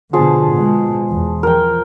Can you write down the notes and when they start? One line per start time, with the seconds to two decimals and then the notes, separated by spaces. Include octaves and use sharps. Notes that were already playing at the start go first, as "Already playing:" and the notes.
0.13 B2 D3 F3 G#4 A5
0.54 B2 G#3
1.11 E2
1.43 F3 A#4 G5